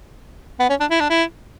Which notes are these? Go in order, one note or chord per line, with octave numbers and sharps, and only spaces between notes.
B3
C#4
D4
E4
D4
E4